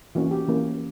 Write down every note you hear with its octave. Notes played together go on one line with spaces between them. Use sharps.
E3 A#3 C#4 F#4
G4
E3 A#3 C#4